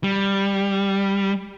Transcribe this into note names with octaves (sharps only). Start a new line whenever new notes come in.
G3